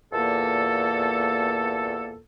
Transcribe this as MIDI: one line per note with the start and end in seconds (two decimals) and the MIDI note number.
0.13 2.17 40
0.13 2.17 46
0.13 2.17 58
0.13 2.17 69